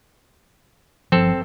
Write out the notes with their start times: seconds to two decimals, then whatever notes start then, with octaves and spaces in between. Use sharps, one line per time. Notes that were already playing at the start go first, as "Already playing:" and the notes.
1.12 G1 F3 C4 A4